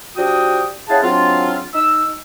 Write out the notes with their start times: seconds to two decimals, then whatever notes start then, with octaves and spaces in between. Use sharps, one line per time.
0.16 F3 D4 F#4 G4 G5 D#6
0.88 C#4 E4 G#4 F5 F#5 A5
1.03 G#2 F#3 C4 D4 F4
1.74 D#4 E6